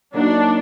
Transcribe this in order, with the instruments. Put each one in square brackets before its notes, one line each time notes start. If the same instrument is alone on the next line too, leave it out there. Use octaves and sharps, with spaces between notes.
[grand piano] F#3 A#3 D#4 F#4 [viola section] D4